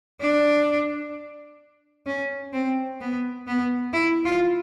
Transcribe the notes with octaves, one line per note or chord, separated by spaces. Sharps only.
D4
C#4
C4
B3
B3
E4
F4